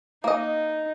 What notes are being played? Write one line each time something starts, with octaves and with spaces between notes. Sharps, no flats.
A#3 D#4 D#5